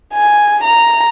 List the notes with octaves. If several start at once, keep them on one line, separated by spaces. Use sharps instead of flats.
G#5
A#5